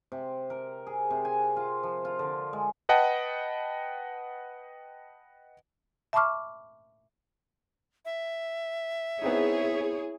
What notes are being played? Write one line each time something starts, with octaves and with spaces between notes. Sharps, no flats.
C3
A#4
G#4
C3
G#5
F4
F3
F4
D3
G#3
B4 D#5 F#5 G5 A5
E5 A5 B5 C#6 D6 F6
E5
B3 C4 D#4 E4 G#4 C#5